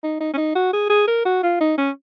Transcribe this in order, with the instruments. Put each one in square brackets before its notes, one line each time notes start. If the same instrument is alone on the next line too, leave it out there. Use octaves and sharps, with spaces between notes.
[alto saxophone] D#4
D#4
C#4
D#4
F#4
G#4
G#4
A#4
F#4
F4
D#4
C#4